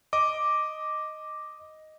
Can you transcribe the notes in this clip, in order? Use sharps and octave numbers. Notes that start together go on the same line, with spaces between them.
D#5 D6